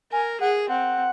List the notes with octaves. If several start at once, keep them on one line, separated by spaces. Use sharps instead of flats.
A#4 G#5
G#4 F#5
C4 F#5